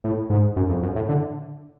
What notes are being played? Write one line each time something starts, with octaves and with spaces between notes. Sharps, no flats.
A2
G#2
F#2
F2
F#2
A2
D3